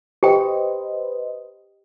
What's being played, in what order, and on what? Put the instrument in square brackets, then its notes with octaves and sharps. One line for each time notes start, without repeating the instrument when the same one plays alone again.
[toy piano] G4 G5 [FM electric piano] B4 C5 D#5